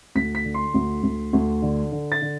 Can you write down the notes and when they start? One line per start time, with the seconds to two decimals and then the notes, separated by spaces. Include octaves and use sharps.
0.15 D2 B6
0.35 B6
0.44 D3
0.54 C6
0.74 D2
1.03 D2
1.33 D2
1.62 D3
1.92 D3
2.12 A6
2.22 D3